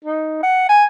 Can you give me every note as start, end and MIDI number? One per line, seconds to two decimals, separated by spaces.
0.04 0.40 63
0.43 0.66 78
0.69 0.84 80